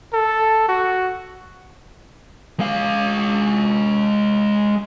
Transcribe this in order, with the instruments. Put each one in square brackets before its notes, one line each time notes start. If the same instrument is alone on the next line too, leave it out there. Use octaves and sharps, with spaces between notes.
[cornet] A4
F#4
[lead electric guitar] G#3 F5